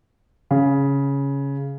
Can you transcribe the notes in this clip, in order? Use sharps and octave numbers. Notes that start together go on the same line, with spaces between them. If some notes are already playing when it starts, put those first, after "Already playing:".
C#3